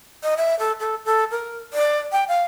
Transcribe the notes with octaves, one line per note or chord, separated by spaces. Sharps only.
D#5
E5
A4
A4
A4
A#4
D5
G5
F5